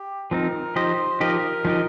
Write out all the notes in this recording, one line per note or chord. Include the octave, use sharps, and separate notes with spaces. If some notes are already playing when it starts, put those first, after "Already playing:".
Already playing: G4
F3 C4 D#4 A#4
F3 D#4 G4 C5 D#5
F3 D#4 G4 A#4 D#5
F3 D#4 G4 D#5